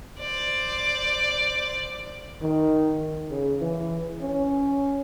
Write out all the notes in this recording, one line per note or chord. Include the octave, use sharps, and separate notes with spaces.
C5 D5
D#3
C#3
E3
C#4